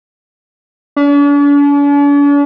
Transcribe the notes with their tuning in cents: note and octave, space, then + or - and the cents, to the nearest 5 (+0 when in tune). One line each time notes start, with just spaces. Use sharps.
D4 -45